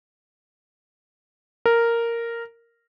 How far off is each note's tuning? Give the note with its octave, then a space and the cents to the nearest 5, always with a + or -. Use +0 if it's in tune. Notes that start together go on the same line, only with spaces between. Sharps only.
A#4 -5